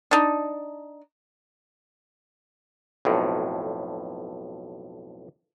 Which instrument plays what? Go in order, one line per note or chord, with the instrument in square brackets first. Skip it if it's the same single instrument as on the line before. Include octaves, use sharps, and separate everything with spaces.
[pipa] D4 D#4
[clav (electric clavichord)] B1 F2 A2